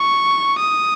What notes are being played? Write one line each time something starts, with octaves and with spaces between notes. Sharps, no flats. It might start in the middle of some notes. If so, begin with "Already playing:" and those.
Already playing: C#6
D#6